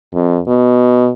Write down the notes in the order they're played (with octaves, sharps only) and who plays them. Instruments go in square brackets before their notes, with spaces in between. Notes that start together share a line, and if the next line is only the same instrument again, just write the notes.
[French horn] F2
B2